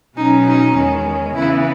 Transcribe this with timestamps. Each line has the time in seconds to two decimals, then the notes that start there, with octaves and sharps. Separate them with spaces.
0.16 B2 F#3 C#4 D#4
0.45 D#4
0.75 E2 D#3 G#3 C#4
1.34 C#3 E3 B3 E4